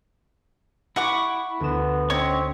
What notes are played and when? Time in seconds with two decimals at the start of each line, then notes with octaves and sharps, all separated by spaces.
0.96 E4 F#5 C#6 D6
1.60 D2 B3 E7
2.10 C4 C#4 C#5 D#5 C#6